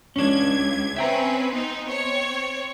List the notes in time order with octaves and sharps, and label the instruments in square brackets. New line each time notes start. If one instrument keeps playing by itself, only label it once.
[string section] C#2 G#6 [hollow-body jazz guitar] C#4 D4
[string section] C4 C#4 B4 [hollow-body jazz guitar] E5 G5 A#5
[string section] B3 C4 D#4
C4 C#5